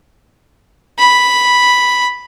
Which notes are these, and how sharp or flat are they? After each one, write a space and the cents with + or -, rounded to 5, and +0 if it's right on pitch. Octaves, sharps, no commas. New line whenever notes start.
B5 +0